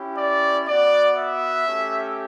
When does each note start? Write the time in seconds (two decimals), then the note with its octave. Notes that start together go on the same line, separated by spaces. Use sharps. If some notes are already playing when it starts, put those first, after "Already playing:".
Already playing: C#4 E4 G4
0.18 D5
0.67 B3 F#4 D5
1.16 E5
1.66 A3 C#4 G4